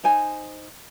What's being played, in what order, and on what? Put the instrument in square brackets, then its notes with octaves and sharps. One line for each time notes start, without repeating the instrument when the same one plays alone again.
[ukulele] D#4 C5 G#5